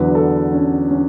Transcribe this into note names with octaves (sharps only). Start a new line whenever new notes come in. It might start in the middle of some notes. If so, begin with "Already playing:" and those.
Already playing: E2 D3 F#3 B4
A4
C#4
C#4